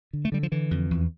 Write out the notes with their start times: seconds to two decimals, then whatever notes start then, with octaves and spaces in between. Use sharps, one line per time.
0.13 D3
0.25 A3
0.32 D3 G3
0.43 F3
0.52 D3 E3
0.71 F2
0.91 E2